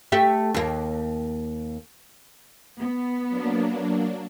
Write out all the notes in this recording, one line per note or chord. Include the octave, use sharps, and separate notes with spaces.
A3 G4 E5
D#2 A#3
B3
F#3 A#3 D4